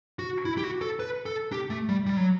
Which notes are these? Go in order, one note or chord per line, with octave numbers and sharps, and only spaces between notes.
F#4
E4
G4
F#4
A4
B4
A4
G4
A3
G3
G3
F#3